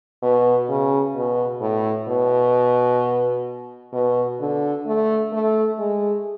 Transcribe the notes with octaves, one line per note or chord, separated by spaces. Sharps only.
B2
C#3
B2
A2
B2
B2
D3
A3
A3
G#3